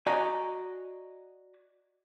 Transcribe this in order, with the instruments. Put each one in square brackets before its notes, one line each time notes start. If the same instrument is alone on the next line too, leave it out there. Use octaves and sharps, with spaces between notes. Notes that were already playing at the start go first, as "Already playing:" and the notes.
[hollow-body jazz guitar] F#4 D5 D#5 G#5 A#5